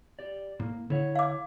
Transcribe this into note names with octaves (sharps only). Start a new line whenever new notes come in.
G4 D5
A2 A#3
D3 E4 C#5 F#5
F5 D6